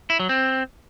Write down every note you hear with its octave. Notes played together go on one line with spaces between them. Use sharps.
E4
F#3
C4